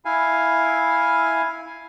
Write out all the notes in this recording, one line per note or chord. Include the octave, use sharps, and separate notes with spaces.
E4 F5 G#5